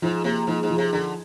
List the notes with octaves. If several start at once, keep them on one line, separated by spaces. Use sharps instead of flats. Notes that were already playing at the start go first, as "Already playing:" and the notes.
G#2 F3
C3 A#3
G#2 F3
G#2
F3
C3
D3 G#4